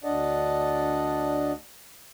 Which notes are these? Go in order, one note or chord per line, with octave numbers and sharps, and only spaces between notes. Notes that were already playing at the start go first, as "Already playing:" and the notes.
D2 D4 D5 D#5 F#5 A5